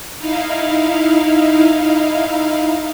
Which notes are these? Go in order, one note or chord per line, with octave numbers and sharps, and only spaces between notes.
D#4 E4 F5